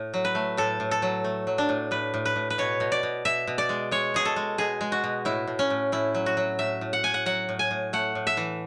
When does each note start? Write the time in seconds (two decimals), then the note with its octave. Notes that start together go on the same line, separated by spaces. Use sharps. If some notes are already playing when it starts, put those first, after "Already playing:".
Already playing: A2
0.14 F#3
0.25 B4
0.35 A3
0.57 A2 A4
0.80 A2
0.91 A4
1.02 F#3
1.24 A3
1.47 F#3
1.58 D4
1.69 A2
1.91 A2 B4
2.14 A2
2.25 B4
2.36 A2
2.50 B4
2.58 B2 C#5
2.80 B2
2.92 D5
3.03 B2
3.25 B2 E5
3.47 B2
3.58 D5
3.69 G#3
3.91 G#3 C#5
4.14 B2 G#4
4.25 A4
4.36 G#3
4.58 B2 G#4
4.81 G#3
4.92 F#4
5.04 B2
5.25 A2 E4
5.47 A2
5.59 C#4
5.70 A2
5.92 A2 E4
6.15 F#3
6.26 F#4
6.37 F#3
6.59 A2 E5
6.81 A2
6.93 F#5
7.03 A2 G#5
7.14 F#5
7.26 F#3 F#5
7.49 A2
7.59 G#5
7.71 A2
7.93 A3 F#5
8.15 A2
8.27 E5
8.37 E3